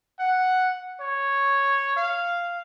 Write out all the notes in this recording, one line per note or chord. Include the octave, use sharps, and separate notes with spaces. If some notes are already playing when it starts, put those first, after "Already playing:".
F#5
C#5
F5